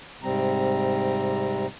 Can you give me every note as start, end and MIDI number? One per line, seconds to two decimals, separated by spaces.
0.23 1.66 44
0.23 1.66 48
0.23 1.66 55
0.23 1.66 60
0.23 1.66 82